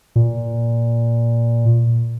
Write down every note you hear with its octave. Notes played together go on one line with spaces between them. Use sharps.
A#2